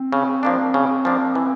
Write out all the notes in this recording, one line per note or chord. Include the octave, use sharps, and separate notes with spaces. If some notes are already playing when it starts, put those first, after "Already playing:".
Already playing: C4
C#3
F3 A#3 D4
C#3
F3 A#3 D4
E3